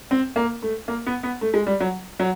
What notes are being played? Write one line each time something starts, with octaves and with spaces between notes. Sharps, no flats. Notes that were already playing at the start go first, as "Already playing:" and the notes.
C4
A#3
A3
A#3
B3
B3
A3
G#3
G3
F#3
F#3